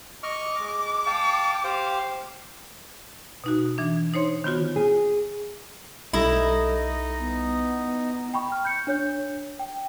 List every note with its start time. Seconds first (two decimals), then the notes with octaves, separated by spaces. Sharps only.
0.23 D#5 C#6 D6 F6
0.59 G#3
1.06 F5 G5 A5
1.64 G4 C5 F5
3.44 B2 D#4 F#4
3.78 E3 D4
4.14 D#4 C5 C#5 C6
4.44 D#3 B3 F4 F#4
4.76 G#4
6.13 B1 G3 D#4 E4 A4 D#5 A#6
7.19 B3
8.34 G5 B5 C#6
8.52 F6
8.65 G6 C#7
8.87 D4 C#5 G6
9.59 G5